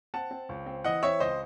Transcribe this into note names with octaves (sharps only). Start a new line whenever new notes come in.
C4 F#5 A5
C4
C#2
C4
E3 D#5 F#5
C4 C#5 E5
C#2 C5 D#5